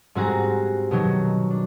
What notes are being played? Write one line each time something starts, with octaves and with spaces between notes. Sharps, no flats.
G#2 G3 C4 F#4 G#4 A#5
B2 D#3 F#3
D4